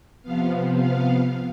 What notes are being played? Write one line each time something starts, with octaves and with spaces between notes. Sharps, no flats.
C3 F3 B3 F5
F5